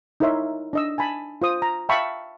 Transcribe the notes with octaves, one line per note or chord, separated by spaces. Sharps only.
D#4 E4 A#4 C#5 E5 C6
D4 D#5 E6
G#5 A5 B5
F4 C5 D#6
A#5
E5 F5 G5 A5 B5 C#6